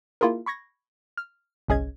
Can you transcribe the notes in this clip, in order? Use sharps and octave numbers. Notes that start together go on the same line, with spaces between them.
A#3 E4 F4 G#4 A#4
B5 C#6 G#6 A#6
F6
G1 C2 C#4 G#4 D#5 G#6